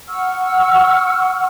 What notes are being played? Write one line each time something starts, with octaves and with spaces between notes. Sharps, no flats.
F#5 C#6 E6 F6